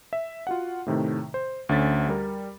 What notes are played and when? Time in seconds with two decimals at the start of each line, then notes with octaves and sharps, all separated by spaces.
0.13 E5
0.47 F4 F#4 F#5
0.86 A2 C3 D#3 A3
1.34 C5
1.69 D2 D3 C#4 A6 B6
2.09 G3 A#4